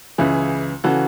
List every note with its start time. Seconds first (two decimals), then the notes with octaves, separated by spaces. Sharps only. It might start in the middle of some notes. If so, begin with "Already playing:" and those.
0.18 C#2 C#3 E3 E4 G#4
0.84 C#3 E3 F#4 A4